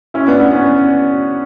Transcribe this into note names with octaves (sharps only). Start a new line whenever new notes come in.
C#4 E4
B3 D4
B3
C#4